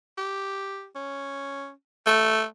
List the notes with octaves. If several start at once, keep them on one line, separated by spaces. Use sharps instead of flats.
G4
C#4
A3